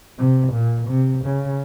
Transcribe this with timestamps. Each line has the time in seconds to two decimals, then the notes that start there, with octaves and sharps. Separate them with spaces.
0.18 C3
0.53 A#2
0.89 C3
1.25 C#3